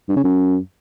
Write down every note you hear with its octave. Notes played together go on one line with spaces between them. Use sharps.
G2
C#3
F#2